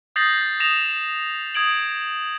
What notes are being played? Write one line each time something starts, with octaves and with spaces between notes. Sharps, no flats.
D#6 G6 A6 A#6 C7 F#7
D#6 A#6 E7 F7
D#6 G#6 D7 F#7